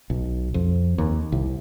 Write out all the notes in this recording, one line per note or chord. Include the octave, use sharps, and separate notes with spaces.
B1
F2
D#2
C2